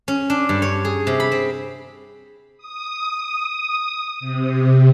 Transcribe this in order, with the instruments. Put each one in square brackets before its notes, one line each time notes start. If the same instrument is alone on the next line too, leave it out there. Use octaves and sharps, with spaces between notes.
[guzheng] C#4
D4
G2
C#5
G#4
C3
B5
C4
[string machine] D#6
C3